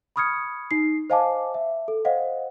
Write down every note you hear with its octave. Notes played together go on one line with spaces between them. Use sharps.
B5 C#6 D#6 F6 G#6 C#7
D#4 C7
C5 D#5 F5 G#5 A5 D6
E5
A4
C5 D#5 F5 F#5